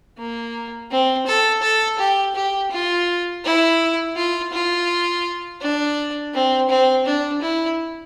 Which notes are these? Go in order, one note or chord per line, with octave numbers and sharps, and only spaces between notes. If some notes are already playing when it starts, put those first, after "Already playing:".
A#3
C4
A4
A4
G4
G4
F4
E4
F4
F4
D4
C4
C4
D4
E4